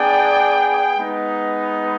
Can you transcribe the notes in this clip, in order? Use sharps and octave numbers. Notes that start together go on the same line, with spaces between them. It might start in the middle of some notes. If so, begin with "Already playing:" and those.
Already playing: B3 D4 G#4 D5 G5
G#3 B3 D#4